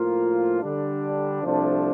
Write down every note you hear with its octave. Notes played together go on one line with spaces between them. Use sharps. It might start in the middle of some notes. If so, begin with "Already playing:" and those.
Already playing: A2 F3 A#3 F4 A#4
D3 G3 D4
C2 C3 F3 A3 D4